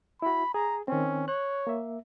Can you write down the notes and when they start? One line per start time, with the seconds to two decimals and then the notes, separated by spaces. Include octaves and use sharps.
0.22 E4 F#4 B5
0.54 G#4 A#5
0.88 D#3 C4 C#4
1.28 C#5 F#6
1.67 A#3 E5